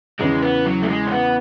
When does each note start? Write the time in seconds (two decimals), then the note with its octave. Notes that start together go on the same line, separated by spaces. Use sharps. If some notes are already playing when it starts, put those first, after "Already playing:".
0.20 E2 C#3 E3 G#3
0.43 B3
0.66 F#3
0.83 A3
0.89 G#3
1.07 C#4
1.11 B3